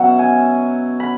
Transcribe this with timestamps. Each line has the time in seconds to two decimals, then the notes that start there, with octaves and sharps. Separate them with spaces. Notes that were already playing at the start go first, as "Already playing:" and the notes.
Already playing: B2 F#3 C#4 E5 F#5
0.19 G#5
1.00 B5